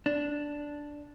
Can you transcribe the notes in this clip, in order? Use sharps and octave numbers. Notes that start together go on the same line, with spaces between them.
D4